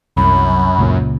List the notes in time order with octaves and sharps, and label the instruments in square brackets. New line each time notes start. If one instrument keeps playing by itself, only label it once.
[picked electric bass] C2 [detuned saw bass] F#2 [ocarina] B5
[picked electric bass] C#2 A#2 C#3